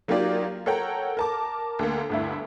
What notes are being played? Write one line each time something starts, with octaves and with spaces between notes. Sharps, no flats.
F#3 A#3 D#4 F4 G4 D5
A4 A#4 C#5 F#5 G5 A#5
A#4 A5 D6
D2 A#3
G1 D2 E4